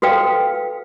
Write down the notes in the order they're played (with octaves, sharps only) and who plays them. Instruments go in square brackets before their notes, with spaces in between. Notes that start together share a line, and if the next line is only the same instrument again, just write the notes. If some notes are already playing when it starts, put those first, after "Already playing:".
[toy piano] F#4 A4 B4 F5 G5